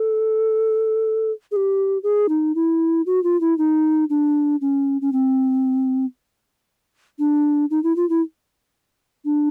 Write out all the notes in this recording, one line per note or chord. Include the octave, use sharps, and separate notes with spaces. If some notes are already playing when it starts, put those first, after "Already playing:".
Already playing: A4
G#4
G4
G#4
D#4
E4
F#4
F4
E4
D#4
D4
C#4
C#4
C4
D4
D#4
E4
F4
E4
D4